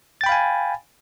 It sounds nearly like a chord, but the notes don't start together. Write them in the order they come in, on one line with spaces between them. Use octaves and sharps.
A6 G5 B5 F5 G#5